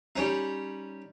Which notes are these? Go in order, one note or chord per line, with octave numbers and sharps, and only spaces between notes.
G3 C#4 D#4